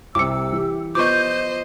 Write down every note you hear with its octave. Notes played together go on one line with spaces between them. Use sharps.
C2 C3 D6 E6 C#7
E3 G4
F3 B3 C5 D#5 C#6 D6 G6